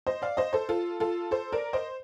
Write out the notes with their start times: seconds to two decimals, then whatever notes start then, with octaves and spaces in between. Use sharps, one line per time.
0.07 C5 D#5
0.22 D5 F5
0.37 C5 D#5
0.53 A4 C5
0.69 F4 A4
1.00 F4 A4
1.31 A4 C5
1.53 A#4 D5
1.73 C5 D#5